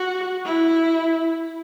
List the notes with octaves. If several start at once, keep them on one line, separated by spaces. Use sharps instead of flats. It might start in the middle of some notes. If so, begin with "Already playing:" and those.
Already playing: F#4
E4